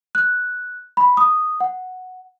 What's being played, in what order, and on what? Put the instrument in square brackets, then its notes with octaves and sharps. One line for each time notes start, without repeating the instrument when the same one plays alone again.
[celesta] F#6
B5
D#6
F#5